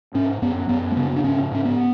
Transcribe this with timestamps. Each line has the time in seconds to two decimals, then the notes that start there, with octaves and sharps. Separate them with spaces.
0.14 G#2 C#4
0.42 F#2 B3
0.69 F#2 B3
0.91 A3
0.96 C#3 B3
1.16 D4
1.24 G#2 C#4
1.51 G#2 C#4
1.65 B3